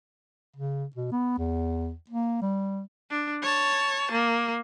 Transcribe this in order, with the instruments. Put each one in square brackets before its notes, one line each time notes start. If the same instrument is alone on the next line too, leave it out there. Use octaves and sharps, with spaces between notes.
[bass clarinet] C#3
B2
B3
E2
A#3
G3
[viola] D4
C#5 A5
A#3